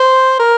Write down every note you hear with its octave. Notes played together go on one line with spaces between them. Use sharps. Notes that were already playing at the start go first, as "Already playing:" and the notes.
Already playing: C5
A#4